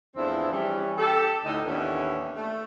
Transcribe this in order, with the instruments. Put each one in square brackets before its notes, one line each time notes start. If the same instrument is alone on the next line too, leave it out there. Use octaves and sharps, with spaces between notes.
[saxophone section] E2 A2 F3 C4 D4 E4
E3 G3 C#4
G4 A4
D2 A2 D3 D#4
D#2 A2 E3 B3 C#4 D4
A3